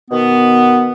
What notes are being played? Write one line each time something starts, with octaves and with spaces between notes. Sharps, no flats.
B2 D#3 B3